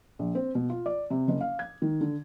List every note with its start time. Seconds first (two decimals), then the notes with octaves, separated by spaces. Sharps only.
0.19 A#1
0.35 C4
0.55 B2
0.70 F4
0.86 D5
1.10 C3
1.28 F#1
1.41 F5
1.59 G#6
1.82 D#3
2.01 D3